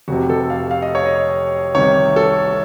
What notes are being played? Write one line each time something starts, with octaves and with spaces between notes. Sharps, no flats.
F1 F2 C3 F#4
A4
F5
F5
D#5
C#5
D#5
C2 C3 D#3 C#5
A4